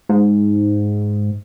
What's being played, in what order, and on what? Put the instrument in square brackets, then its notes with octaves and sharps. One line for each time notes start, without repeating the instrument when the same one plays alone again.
[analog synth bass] G#2